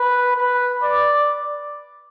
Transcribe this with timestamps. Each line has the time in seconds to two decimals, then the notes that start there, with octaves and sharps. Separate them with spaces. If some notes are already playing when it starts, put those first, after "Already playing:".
Already playing: B4
0.36 B4
0.83 D5